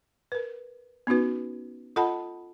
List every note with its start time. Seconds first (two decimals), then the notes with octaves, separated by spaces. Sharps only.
0.32 A#4 B4
1.07 B3 C#4 D#4 F#4 B4
1.96 F4 A4 D#5 F#5 A5 B5